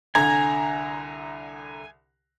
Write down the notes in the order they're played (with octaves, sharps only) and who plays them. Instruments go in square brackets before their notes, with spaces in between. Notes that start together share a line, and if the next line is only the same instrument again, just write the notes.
[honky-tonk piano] C2 D3 A#5 [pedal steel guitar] G#5